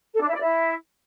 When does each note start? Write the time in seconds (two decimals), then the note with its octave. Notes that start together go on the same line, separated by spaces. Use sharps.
0.14 A4
0.21 D4
0.28 E4
0.35 D5
0.42 E4